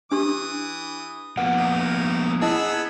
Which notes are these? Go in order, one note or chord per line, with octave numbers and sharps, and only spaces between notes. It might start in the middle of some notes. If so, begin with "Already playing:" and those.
E3 D4 G4 C#6 D#6
F3 A#3 B3 F#5
D#4
B3 E4 G#4 D#5 F#5 A5 E6